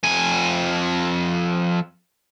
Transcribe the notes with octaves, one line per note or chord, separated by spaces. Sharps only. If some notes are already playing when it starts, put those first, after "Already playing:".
F2 G#5